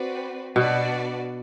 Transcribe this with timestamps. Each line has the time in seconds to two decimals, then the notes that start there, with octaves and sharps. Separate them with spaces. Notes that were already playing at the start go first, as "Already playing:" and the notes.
Already playing: C4 F#4 B4 D5
0.56 B2 B3 D4 F#4 B4 D5